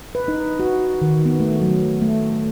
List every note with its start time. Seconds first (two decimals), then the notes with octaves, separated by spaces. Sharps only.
0.15 B4
0.28 D#4
0.60 F#4
1.02 D#3
1.26 B3
1.40 A3
1.61 F#3
2.02 A3